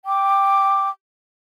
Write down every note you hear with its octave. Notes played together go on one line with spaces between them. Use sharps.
G5 D6